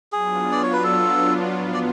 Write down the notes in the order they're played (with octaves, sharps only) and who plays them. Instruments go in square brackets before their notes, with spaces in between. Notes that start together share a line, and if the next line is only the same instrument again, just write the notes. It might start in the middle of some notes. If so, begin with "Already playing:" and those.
[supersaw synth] F#3 B3 D4 F4 [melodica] G#4
[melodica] D5
C#5
B4
A4
[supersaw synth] A2 F3 B3 F4
[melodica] D5